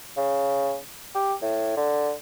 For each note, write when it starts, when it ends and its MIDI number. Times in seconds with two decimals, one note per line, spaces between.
0.17 0.77 49
1.15 1.34 67
1.42 1.76 45
1.77 2.12 50